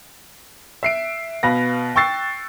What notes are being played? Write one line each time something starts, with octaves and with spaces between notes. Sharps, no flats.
E5 C7 D7
B2 B4 F5 A#6
G5 C#6 E6 A6 C7